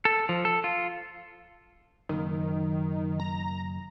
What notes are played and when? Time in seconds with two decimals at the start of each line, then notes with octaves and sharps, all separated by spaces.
0.05 A4
0.29 F3
0.45 A4
0.64 F4
2.09 F#1 D#3
3.20 A#5